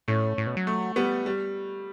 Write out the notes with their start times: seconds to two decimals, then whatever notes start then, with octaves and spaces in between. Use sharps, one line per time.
0.08 A2 A3 C#4
0.38 A2
0.47 B2
0.57 F#3
0.67 A3
0.96 G3 B3
1.26 G3